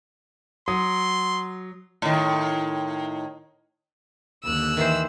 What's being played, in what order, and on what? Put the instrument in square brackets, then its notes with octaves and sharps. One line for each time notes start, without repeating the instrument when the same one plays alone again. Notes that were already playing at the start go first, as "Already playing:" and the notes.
[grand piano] F#3 D#6 [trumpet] C6
[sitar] A2 D#3
[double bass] D#2 D3 [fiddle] E6 F#6
[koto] D#3 E3 C5